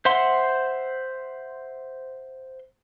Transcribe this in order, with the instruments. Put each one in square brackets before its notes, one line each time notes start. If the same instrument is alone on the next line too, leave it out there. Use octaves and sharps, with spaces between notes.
[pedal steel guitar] C5 E5 F#5 C6